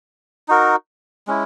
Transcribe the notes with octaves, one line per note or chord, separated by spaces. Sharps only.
D#4 F#4 A#4
G#3 C#4 E4